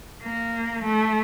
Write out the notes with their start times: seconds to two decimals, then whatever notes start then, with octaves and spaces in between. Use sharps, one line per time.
0.24 A#3
0.85 A3